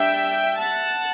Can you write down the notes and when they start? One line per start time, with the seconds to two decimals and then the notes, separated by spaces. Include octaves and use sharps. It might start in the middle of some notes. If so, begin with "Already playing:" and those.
Already playing: G3 D4 E5 G5
0.59 F#5 A5